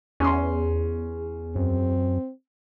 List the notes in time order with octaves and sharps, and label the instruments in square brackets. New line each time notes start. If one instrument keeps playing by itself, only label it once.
[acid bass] E2 [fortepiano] C#4 C6
[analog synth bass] F#2 [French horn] C4